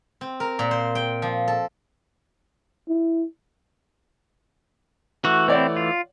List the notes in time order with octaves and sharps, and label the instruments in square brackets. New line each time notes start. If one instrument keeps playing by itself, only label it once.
[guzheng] C4
A#4
A#2
C5
G5
F3
A4
[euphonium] E4
[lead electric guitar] E3 A3 [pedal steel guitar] F#4
[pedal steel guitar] C4 E4 [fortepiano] C#5 D5 F#5
[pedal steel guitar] F4